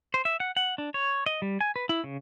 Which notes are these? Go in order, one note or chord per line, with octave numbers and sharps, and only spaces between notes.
C5
E5
F#5
F#5
D4
C#5
D#5
G3
G#5
B4
E4
C#3